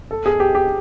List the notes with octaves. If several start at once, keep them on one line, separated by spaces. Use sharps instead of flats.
A4
G#4
G4
G4